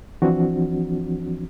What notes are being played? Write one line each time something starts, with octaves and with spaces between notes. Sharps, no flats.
E3 F3 C4 D4 F#4